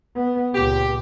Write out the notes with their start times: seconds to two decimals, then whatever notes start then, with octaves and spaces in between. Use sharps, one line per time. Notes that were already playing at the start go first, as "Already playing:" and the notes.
0.16 B3
0.54 C#2 A#2 G4